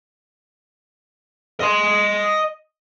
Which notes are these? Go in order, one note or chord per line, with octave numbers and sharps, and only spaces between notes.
D#5 C6